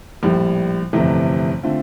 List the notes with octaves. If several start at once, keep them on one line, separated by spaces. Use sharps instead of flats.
A#1 A2 G3
G1 F2 C3 E3 A3
D3 A3 C4 F4